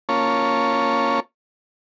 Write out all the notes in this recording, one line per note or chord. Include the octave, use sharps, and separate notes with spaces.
A#3 C#4 F4 C#5 A5